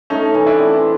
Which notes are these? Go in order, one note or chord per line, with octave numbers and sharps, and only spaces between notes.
A3 C#4 D#4
E3
D4 E4
C4